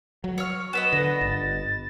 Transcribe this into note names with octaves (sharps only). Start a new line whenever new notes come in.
F#3
C#5 F6
B3 B4 D#5 E7
D3 A#6
G1 A6